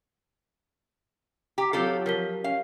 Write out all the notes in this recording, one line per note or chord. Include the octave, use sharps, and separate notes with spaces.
G4 A#5 D6 B6
F#3 C4 F4 G4 A4 C#7 G7
F3 A#4 B6 G7
C#4 F5